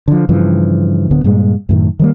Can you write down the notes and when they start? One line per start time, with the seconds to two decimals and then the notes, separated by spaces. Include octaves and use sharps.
0.08 D3 F3
0.29 G2 C#3 E3 F3
1.11 D1 D3 B3
1.24 G2 A#2 G3 G#3
1.69 F#2 A2 D#3
1.99 D#3 G3 A#3